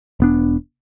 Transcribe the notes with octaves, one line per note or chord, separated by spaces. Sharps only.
E1 B3 D4